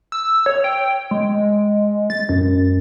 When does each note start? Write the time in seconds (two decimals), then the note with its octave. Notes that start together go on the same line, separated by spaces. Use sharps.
0.12 E6
0.46 C#5
0.64 G5
1.11 G#3
2.10 A6
2.29 F#2